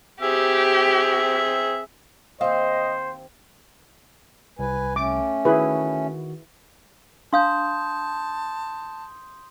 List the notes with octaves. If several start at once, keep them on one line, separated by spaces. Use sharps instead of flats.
C4 G4 G#4 E5
D#2 C4 C5 D#5 F5
C2 B4 G#5
A3 C#4 D6
D#3 E4 F#4 G#4 B4
D4 F5 A5 C6 D#6 G6